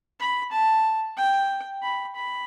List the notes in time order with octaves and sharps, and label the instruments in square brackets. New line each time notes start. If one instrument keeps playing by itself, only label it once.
[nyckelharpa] B5
A5
G5
B5
B5